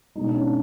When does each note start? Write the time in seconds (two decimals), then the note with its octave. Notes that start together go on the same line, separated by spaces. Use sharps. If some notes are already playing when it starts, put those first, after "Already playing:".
0.15 B2 G#3 D#4
0.25 D4
0.34 C#4
0.44 D4